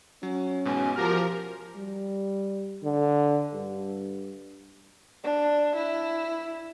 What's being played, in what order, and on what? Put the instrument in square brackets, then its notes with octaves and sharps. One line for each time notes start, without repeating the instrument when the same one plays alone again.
[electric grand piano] F#3 [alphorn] C#4
[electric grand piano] A1 G#2 B2 [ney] G#5
[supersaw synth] F3 A#4 [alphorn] F#4 [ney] G4 [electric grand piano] F6 A#6
[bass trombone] G3
D3
G2
[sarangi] D4
E4